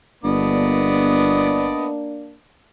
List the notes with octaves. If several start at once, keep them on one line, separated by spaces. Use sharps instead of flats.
G1 A#3 B3 D4 D5 D#5